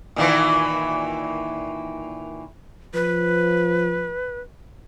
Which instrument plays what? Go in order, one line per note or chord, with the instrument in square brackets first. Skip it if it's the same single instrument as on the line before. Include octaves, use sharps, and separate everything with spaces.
[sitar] A#2 D#3 E3
[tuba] F3 [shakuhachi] B4